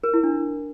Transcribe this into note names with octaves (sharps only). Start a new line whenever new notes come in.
A#4
E4
D4